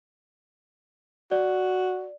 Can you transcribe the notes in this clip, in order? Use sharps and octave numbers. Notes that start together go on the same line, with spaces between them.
F#4 D5